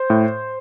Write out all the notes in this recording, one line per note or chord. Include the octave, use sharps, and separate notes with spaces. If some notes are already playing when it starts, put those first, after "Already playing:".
Already playing: C5
A2